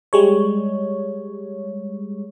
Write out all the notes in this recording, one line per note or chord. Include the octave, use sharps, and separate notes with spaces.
G3 G#3 C#5